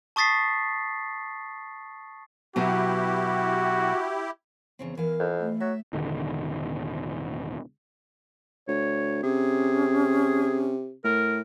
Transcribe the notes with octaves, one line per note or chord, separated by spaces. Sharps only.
A5 C#6 D#6 A6 B6 C7
B2 F#3 B3 E4 F#4 G4
E2 C#3 C4
E3 A#4 F5
F2
A3
F#3 E5
E1 A1 D3 D#3
D2 C#5
C3 C#4 G#4
A2 A#4